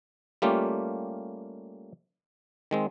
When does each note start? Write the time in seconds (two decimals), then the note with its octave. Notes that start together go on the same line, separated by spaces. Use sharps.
0.42 G3 A3 A#3 C#4 F4 G4
2.71 D#3 G#3 C4